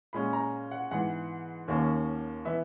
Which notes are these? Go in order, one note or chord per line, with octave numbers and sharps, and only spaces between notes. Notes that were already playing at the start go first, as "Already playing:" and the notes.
A#2 G#3 C#4 B5
A#5
F#5
G#2 E3 B3 F#5
D#2 D#3 A#3 C#4
E3 B3 E5